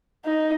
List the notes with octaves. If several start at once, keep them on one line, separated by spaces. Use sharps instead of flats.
D#4